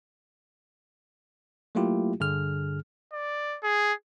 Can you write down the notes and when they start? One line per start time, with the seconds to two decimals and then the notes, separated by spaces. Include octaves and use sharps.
1.75 F#3 A3 A#3 E4 F4 G4
2.20 G2 D3 G#4 F6
3.13 D5
3.63 G#4